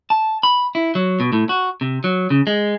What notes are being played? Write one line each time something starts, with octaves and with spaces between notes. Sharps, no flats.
A5
B5
E4
F#3
B2
A2
F#4
C3
F#3
C#3
G#3